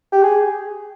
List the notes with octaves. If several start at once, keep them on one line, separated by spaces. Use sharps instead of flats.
G4
G#4